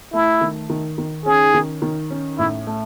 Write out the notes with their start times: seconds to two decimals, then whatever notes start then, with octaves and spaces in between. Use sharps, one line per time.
0.13 A3 E4
0.41 D#3
0.70 D#3
0.98 D#3
1.25 C#4 G#4
1.54 D#3
1.82 D#3
2.10 C#4
2.38 A2 E4
2.67 A3